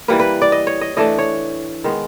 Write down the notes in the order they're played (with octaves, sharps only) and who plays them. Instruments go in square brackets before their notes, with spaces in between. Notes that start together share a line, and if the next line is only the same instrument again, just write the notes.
[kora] E3 G3 A#3 B4
B4
D5
D#5
C#5
D#5
E3 A3 D4 D#5
C#5
D#3 G#3 B3